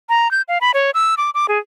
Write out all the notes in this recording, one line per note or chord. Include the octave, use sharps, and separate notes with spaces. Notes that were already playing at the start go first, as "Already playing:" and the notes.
A#5
G6
F5
B5
C#5
E6
D6
D6
G#4